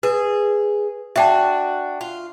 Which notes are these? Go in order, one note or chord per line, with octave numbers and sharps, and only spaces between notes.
G#4 B4
D4 F#4 E5 G5 A5
F4